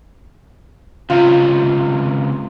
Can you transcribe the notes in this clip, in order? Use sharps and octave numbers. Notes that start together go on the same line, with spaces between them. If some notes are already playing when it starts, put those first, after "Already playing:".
C#2 C3 F4